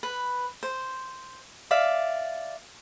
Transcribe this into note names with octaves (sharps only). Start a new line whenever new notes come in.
B4
C5
D5 E5 F5